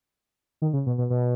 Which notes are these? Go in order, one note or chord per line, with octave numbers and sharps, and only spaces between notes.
D#3
C#3
B2
B2
B2